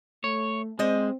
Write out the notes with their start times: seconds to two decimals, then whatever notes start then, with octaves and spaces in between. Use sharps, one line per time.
0.24 A3 C#5
0.79 G#3 C4 C5 D#5